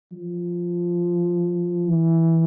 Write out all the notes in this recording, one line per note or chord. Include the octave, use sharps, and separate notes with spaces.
F3
E3